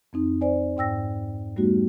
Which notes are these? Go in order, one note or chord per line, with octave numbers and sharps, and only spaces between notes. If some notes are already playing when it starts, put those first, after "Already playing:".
F2 C4 D#4
C5 D5 G#5
G#2 G5 E6 A#6
G3 A3 B3 D#4 F#4 G4